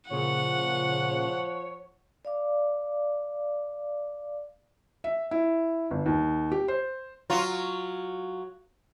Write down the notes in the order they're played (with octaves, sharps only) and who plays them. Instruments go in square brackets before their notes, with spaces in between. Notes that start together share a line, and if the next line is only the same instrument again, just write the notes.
[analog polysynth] A#2 C#3 [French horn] F3 [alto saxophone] C#5 [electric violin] F#5
[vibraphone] D5 F5 D6
[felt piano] E5
E4
G1
D#2
G4
C5
[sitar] F#3 F4